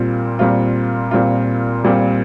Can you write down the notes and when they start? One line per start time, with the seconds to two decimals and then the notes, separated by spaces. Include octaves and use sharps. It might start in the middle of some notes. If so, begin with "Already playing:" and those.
Already playing: A#2 G3 C4 F4
0.39 A#2 G3 C4 F4
1.11 A#2 G3 C4 F4
1.84 A#2 G3 C4 F4